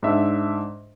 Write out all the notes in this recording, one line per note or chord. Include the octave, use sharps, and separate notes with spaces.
G#2 D4 E5